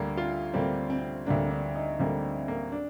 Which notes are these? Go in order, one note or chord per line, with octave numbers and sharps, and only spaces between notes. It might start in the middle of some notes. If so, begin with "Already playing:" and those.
Already playing: D2 D3 G3 A#3
F4
D2 D3 G3 A#3 C4
C4
D2 D3 G3 A#3 D4
D4
D#4
D2 D3 G3 A#3 C4
A#3
D4